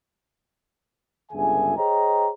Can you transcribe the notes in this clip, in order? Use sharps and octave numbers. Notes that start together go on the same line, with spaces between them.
G1 C#2 D3 G#4 E5 G#5
G#4 C5 C#5 D#5 G5 A#5